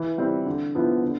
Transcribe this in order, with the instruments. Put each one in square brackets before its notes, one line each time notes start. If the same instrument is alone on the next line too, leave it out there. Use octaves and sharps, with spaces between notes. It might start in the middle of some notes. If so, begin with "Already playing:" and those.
Already playing: [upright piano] E3
G3 C4 E4
D3
F3 B3 E4
D3